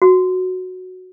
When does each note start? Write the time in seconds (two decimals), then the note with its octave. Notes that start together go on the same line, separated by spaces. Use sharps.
0.02 F#4